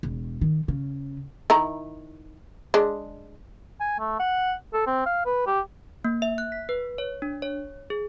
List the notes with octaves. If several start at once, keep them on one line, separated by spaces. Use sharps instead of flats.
E1
D#3
C#3
D#3 E4 A#5
G#3 D4
G#5
A3
F#5
A4
C4
F5
B4
G4
A#3
E5
F#6
B6
B4
C#5
D4
C#5
G#4